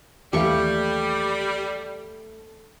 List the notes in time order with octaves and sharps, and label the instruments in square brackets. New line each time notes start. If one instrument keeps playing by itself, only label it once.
[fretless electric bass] D#2 E3 [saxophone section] G3 [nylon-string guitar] A3 F5 [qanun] G4 C#6